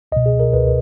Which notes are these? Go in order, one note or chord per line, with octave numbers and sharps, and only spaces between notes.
C#2 B2 D#5
G#4
A#4
C#2 B2 B4